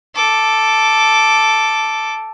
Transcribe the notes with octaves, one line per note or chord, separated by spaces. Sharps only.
A4 D6